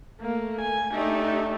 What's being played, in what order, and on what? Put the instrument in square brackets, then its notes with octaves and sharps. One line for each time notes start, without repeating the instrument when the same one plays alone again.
[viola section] A3 [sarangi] A#3
[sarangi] G#5
[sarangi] A3 [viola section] D4 D#4 G4